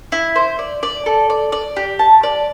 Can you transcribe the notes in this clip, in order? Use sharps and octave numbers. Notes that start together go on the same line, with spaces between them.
E4
C5
D5
D5
A4
D5
D5
G4
A5
D5